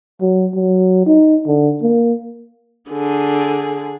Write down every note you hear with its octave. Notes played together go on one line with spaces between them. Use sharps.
F#3
F#3
D#4
D3
A#3
D3 G#4